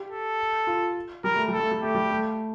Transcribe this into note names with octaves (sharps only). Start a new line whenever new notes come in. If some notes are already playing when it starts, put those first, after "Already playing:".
Already playing: G4
A4
F4
G3 A#4
A3
G3 A4
A3
G3
A3 G4
G3
A3